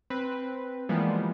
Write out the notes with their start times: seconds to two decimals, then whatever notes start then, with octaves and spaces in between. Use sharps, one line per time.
0.10 C4 B4
0.89 E3 F3 G3 G#3 A#3 B3